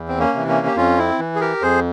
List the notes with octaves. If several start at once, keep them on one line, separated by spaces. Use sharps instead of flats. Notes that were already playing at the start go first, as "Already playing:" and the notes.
Already playing: E2
C4
A#3 C#4
C3 E3
A#3 C#4
G4
F2 C#4 F4
C4 E4
E3
G#4
G4 A#4
F2 G#4 C5